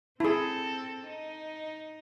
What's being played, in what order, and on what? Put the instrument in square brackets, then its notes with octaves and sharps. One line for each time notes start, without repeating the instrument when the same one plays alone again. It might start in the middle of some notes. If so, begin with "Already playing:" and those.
[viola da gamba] C4 A4 [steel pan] E4 G#4
[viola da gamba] D#4